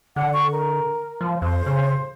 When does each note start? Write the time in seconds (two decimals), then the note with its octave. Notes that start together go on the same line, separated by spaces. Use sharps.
0.16 D3 F#5
0.33 C#6
0.52 A#4
1.21 F3
1.42 F2 C5
1.66 C#3